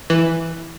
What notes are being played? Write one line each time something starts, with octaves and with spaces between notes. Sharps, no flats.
E3